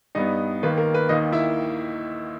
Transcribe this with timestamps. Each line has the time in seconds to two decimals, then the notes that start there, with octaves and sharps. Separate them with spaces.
0.15 G2 G3 B3 D#4 D#5
0.63 D#2 D#3 A#3 B4
0.78 A#4
0.94 B4
1.09 D#2 D#3 A#3 D#4 D#5
1.32 E4 E5